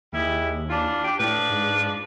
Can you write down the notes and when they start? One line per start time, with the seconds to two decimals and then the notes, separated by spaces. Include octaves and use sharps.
0.13 D#2 G3 G#3 E4
0.69 E3 D4 F4
1.04 D4 G4
1.19 A2 F3 D4 B4
1.49 G#2